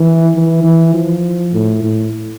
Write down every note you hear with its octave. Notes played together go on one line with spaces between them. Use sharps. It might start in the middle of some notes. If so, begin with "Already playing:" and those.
Already playing: E3
E3
E3
F3
A2
A2